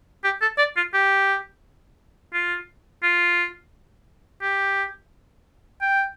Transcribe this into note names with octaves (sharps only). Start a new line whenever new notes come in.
G4
A4
D5
F4
G4
F4
F4
G4
G5